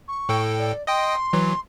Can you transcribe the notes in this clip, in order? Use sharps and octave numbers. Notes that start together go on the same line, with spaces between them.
C#6
A2 A4 G5
D5
D#5 G5 C6 D#6
E3 F#3